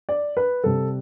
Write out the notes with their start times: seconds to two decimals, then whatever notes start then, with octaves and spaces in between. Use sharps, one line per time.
0.09 D5
0.37 B4
0.64 C3 G3 A4